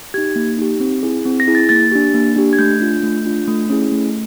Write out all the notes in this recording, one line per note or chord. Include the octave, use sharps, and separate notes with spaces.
D#4 G4 G#6
A#3
D#4 G4
C4
E4 G#4
C4
A#6
E4 G#4
A6
A#3 A6
D4 G4
A#3
D4 G4
G#6
A3 G6
D4 F4
A3
D4 F4
A3
C#4 E4 G#4
A3